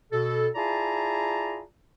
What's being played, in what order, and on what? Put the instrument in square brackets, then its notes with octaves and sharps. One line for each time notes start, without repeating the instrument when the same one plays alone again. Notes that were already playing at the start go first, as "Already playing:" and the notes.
[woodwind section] B2 A4
E4 F4 G#4 D5 A5 A#5